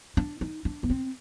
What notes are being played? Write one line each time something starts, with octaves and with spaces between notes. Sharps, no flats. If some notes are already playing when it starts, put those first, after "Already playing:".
D4
D#4
D4
B3
C4